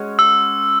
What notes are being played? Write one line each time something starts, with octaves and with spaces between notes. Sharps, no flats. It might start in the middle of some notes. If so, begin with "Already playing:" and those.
Already playing: G#3 C#4 F#4 C#5
E6